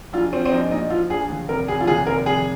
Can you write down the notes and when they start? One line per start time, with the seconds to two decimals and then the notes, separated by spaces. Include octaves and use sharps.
0.13 A#1 F4
0.33 F3 C4
0.45 C4
0.51 A#1 D#4
0.71 A#2 D#4
0.90 F3 F4
1.10 A#1 G#4
1.29 D#2
1.49 F1 A#4
1.68 F1 G#4
1.80 F4
1.87 D#2 G#4
2.07 F1 A#4
2.26 F1 G#4